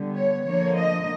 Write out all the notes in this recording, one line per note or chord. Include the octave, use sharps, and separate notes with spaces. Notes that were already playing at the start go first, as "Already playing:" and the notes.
Already playing: D3 G3 B3
C#5
D3 F3 A#3 C#5
D#5